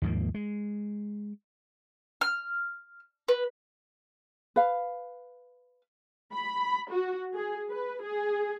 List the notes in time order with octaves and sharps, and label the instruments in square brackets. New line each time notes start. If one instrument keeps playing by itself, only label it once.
[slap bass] D#2 G#2 F3 A#3
G#3
[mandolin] F6
B4
[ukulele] B4 F5
[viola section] B5
F#4
G#4
B4
G#4